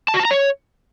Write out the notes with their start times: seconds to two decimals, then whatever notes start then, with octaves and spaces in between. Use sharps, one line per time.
0.08 A5
0.14 F#4
0.20 A5
0.25 A#5
0.31 C#5